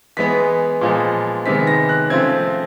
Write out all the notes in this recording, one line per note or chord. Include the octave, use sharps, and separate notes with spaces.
E3 G#3 B3 B6
A#2 F3 G#3 B3
C3 D#3 G#3 B3 B6
A#6
F#6
C#3 F3 A3 C4 G#6